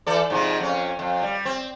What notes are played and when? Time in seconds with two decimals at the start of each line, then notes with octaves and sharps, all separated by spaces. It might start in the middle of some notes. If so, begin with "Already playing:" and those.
0.07 E3 A4 D5
0.30 G#2 C3 F3
0.60 F2 C#4
0.99 F2
1.23 G3
1.45 C4